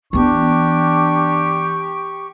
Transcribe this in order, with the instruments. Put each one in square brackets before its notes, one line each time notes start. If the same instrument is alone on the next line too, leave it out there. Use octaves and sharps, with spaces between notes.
[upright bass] E3 B3 [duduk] D4 [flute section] G4 G5 C#6